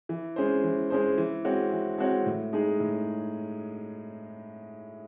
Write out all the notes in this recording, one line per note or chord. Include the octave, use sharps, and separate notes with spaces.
E3
G#3 C#4 G#4 C5
E3
G#3 C#4 G#4 C5
E3
G#3 C4 F#4 C#5
E3
G#3 C4 F#4 C#5
A2
G#3 D#4 G#4
A2